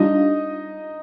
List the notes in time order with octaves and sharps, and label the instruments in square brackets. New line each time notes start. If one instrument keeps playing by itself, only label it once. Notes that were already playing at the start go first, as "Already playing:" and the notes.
Already playing: [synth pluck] G3 D4 F4 [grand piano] D#4 D#5